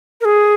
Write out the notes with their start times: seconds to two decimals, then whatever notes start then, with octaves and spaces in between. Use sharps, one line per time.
0.21 A#4
0.25 G#4